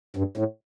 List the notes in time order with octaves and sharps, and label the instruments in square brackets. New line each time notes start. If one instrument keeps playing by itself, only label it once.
[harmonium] G2
A2